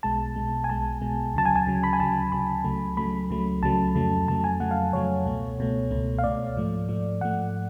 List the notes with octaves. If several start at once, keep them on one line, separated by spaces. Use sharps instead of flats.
B1 B2 G#3 A5
B1 B2 G#3
G#5
B1 B2 G#3 A5
B1 B2 G#3
D2 C#3 F#3 A5
G#5
G#5
D2 C#3 F#3
B5
G#5
D2 C#3 F#3 A5
D2 C#3 F#3 B5
C#2 C#3 F#3 A3
C#2 C#3 F#3 A3 B5
C#2 C#3 F#3 A3
C#2 C#3 F#3 A3 A5
F2 C#3 F#3 A3
F2 C#3 F#3 A3 A5
G#5
F2 C#3 F#3 A3 F#5
F5
F2 C#3 F#3 A3 C#5
C#2 B2 A3
C#2 B2 A3
C#2 B2 A3
F5
C#2 B2 A3 D5
G#2 F3 A3
G#2 F3 A3
G#2 F3 A3 F#5